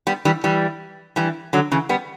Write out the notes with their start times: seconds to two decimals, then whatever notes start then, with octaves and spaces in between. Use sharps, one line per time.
0.07 G3 B3
0.25 E3 G3
0.44 E3 G3
1.16 E3 G3
1.53 D3 F#3
1.72 C#3 E3
1.89 G3 B3